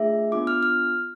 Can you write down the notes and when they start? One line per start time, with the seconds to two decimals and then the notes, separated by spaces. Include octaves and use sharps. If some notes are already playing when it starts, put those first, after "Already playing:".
Already playing: A3 D4 F4 G#4 E5
0.32 B3 D4 F4 D6
0.47 F6
0.63 F6